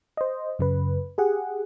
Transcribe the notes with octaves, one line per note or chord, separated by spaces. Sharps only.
C5 D#5
F#2 C#3 B4
G4 G#4 F#5